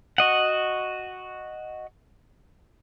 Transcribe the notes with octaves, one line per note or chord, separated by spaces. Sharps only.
F#4 D#5 F#5